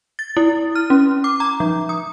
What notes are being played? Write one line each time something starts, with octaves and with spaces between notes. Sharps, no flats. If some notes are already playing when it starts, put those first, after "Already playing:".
A6
E4
F6
C#4
D6
A#5
F3
D#6